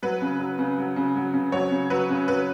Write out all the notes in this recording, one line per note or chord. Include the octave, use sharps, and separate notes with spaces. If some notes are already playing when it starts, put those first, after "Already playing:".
F#3 B4
C#3
F#3
C#3
F#3
C#3
F#3
C#3
F#3 C#5
C#3
F#3 B4
C#3
F#3 B4